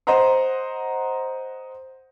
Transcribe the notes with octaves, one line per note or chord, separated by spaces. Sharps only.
C5 D#5 F#5 A#5 C6